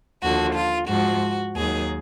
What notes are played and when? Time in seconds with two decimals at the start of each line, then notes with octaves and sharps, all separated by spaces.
0.22 D#2 D3 F3 F#4
0.55 F4
0.89 G#2 F3 F#4
1.56 D#2 D#3 F#3 G#4